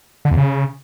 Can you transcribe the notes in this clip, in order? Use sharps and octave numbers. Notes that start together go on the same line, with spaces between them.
D3
E2
C#3